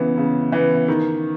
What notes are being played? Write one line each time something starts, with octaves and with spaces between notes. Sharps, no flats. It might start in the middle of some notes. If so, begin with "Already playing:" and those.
Already playing: C#3 E3 B3
C#3
E3 B3
D#3